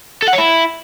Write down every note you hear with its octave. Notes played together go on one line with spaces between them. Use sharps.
A4
F#5
C#5
E4